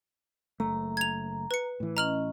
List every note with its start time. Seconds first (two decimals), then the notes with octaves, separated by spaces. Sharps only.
0.60 F#1 A3 A#5
0.97 G#6 F7
1.51 B4 C#7
1.80 A2 E3
1.97 C#4 D#5 A#5 F6 F#7